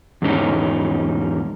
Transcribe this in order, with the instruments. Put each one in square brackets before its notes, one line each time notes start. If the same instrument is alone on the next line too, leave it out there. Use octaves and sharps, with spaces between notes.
[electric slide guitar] E2 G#2 C#4 D#4